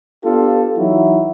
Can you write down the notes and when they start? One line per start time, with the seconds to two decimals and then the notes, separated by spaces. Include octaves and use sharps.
0.24 B3 D4 F4 G4 A4
0.77 E3 F#3 D#4 E4 F#4